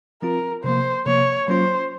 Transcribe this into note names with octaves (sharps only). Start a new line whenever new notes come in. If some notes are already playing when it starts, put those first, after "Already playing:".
F3 C4 F4 A#4
C3 F3 A#3 C5
C3 F3 A#3 C#5
F#3 A#3 C#4 F4 C5